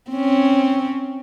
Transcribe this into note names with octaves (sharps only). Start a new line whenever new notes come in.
C4 C#4